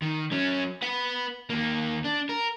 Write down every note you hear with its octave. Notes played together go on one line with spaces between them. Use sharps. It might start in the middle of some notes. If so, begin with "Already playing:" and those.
D#3
F#3 C#4
B4 F#5
D#2 A#3
D4
A#4